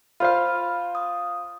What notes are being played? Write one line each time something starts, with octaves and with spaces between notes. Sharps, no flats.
F4 C5 F5 B5 F6
D#6